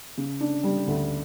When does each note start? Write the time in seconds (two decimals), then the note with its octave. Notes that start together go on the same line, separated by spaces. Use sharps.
0.17 C#3
0.41 D4
0.64 G3
0.87 D2